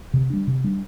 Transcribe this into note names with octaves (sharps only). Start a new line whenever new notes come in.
C3
G3 D4
C3
G3 D4